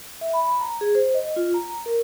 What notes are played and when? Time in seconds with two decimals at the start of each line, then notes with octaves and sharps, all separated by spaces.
0.21 E5
0.33 B5
0.61 A#5
0.81 G#4
0.95 C5
1.15 D#5
1.36 F4
1.54 A#5
1.86 A#4